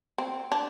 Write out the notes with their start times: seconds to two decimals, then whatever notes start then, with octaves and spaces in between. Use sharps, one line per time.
0.18 C4
0.52 D4